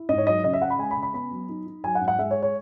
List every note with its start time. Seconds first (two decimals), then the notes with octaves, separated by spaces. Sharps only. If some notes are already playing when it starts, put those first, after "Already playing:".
Already playing: E4
0.09 G#2 D#5
0.18 C#5
0.27 F#3 D#5
0.44 C#3 D#5
0.53 E5
0.61 C#4 F#5
0.70 B5
0.79 G#3 G#5
0.91 B5
0.97 C#3
1.03 B5
1.14 B3 B5
1.31 F#3
1.49 D#4
1.67 D#4
1.84 F#3 G#5
1.95 F#5
2.01 G#2
2.08 F#5
2.19 G#3 E5
2.31 C#5
2.42 C#5